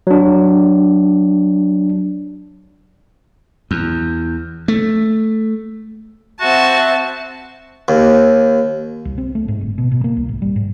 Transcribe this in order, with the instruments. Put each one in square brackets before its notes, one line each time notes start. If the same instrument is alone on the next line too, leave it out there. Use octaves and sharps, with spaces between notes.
[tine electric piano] F#3 D4
[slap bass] E2
A3
[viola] C4 A5 [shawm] F#4 [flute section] E5 F#5
[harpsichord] D#2
[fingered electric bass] C2
C4
A3
G#2
G1
B2
B2
A#3
C2
G#1
G3
G#2